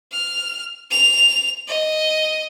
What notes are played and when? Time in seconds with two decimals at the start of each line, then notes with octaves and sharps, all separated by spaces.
0.12 F6
0.91 F7
1.68 D#5